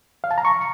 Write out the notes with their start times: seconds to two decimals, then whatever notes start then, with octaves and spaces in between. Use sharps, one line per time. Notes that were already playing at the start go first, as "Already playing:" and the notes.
0.24 F5
0.31 A5
0.38 A#5
0.45 C#6